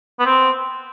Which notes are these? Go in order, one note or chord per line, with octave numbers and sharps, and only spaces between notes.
B3
C4